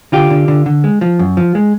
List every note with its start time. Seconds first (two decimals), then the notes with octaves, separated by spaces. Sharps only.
0.12 D3 F4 G4
0.30 D3
0.48 D3
0.66 D3
0.84 G#3
1.01 F3
1.19 F#2
1.37 F3
1.55 G#3